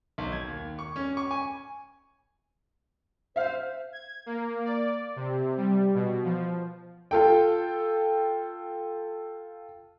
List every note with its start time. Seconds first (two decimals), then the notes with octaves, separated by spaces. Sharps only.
0.18 B1
0.32 G#6
0.48 D#2
0.79 C#6
0.96 C#4
1.17 C#6
1.31 G#5
3.36 C5 E5 F5 F6
3.93 G#6
4.26 A#3
4.65 D5
5.16 C3
5.57 G3
5.94 B2
6.24 F3
7.11 F4 A4 G5